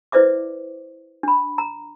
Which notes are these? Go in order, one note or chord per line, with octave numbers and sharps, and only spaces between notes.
E4 B4 C5 D5 E5 D6
D4 B5
A#5